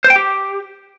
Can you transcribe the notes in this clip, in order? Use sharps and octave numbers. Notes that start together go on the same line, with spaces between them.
C5
G5
G4